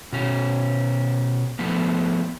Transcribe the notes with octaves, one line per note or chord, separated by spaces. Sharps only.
B2 C#4
F3 A3 B3